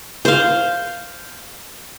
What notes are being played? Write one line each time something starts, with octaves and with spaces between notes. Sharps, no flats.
C5 F5